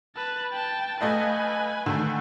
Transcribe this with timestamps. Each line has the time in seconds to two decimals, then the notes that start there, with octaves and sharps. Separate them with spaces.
0.15 B4 A5
0.52 G5 A5
1.01 A3 B4 D#5 F5 G#5
1.86 D3 D#3 A3